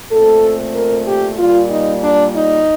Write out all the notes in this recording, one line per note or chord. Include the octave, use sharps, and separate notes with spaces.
A#2 A3 C4 A4
A#4
G4
A#2 G3 A#3 F4
D#4
D4
D#4